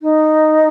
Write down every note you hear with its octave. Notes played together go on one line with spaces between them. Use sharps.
D#4